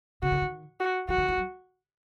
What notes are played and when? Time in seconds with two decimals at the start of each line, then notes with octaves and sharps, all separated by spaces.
0.22 C#3 F#4
0.32 D3
0.42 D#3
0.80 F#4
1.09 E3 F#4
1.18 D#3
1.28 E3
1.37 F#3